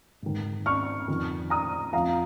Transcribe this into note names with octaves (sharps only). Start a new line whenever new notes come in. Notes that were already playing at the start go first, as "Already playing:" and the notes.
G#2 D#3
C#6 F6
F2 D#3
A#5 D#6
F2 F3 F5 A#5